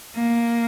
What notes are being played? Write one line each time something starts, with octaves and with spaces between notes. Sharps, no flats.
A#3